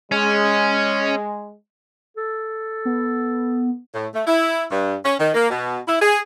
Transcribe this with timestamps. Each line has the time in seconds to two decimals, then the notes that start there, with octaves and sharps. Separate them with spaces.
0.12 G#3 C#4
2.17 A4
2.85 B3
3.94 A2
4.14 A3
4.27 E4
4.71 G2
5.05 C#4
5.19 D#3
5.34 A#3
5.50 B2
5.88 E4
6.01 G#4